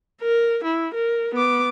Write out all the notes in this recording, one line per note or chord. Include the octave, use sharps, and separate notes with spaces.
A#4
E4
A#4
B3 D6